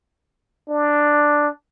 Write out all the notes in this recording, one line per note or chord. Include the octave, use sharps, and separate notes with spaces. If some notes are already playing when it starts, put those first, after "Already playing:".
D4